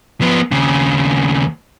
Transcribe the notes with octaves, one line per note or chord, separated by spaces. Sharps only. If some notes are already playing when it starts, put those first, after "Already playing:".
F3 B3
D#2 C#3